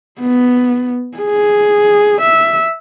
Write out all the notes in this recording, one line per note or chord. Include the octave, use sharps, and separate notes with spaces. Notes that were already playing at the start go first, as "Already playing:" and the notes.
B3
G#4
E5